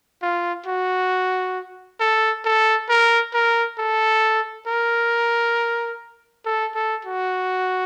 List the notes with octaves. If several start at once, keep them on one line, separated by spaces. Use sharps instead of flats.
F4
F#4
A4
A4
A#4
A#4
A4
A#4
A4
A4
F#4